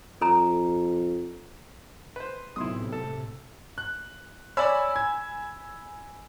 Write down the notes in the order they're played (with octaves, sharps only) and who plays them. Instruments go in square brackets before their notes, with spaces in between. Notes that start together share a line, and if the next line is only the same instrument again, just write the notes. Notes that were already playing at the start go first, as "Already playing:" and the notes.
[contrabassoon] F2 [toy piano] A4 A#5
[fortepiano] B4 C5
[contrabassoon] B1 [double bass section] A2 C3 [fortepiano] E4 C6 D#6
[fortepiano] A4
[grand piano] F#6
[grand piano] C#5 D5 [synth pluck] G#5 B5 E6
[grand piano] G#6